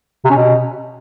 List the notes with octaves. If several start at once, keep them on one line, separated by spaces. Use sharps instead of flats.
C3
C#4
B2